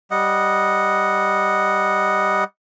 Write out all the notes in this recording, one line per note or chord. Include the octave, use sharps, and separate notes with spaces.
G3 D#5 F#5